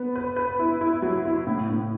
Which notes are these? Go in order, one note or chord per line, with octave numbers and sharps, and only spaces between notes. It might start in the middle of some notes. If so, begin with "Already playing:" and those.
Already playing: B3 B4
B4
B4
E4
E4
F#3
E4
A2
A2